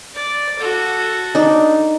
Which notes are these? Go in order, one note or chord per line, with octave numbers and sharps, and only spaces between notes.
D5
F#4 A4
D4 D#4